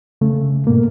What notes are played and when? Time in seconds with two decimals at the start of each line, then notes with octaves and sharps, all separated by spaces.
0.21 C#3 A3
0.67 G#2 B2 A#3